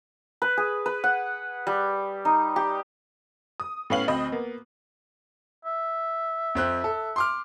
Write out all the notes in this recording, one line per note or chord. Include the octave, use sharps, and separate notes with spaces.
B4
G#4
B4
F#5
G3
D#4
G4
D#6
A2 B3 C#4 F5 F#7
D2 C4 D#5 B5
A#3 B3
E5
F2 C4 F#6
A4
C6 D6 F6